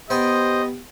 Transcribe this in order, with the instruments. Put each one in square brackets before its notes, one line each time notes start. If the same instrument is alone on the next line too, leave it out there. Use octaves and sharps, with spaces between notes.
[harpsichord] B3 G5 [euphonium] G4 [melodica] C5 [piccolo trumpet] D#5